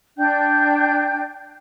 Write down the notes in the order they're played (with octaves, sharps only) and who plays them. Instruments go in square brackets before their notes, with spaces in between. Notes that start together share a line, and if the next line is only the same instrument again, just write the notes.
[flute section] D4 G5 G6